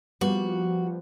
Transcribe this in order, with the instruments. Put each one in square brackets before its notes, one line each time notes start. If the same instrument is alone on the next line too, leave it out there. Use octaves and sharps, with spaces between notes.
[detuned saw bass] F3 [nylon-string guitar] G3 A#3 B3 [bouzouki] F#4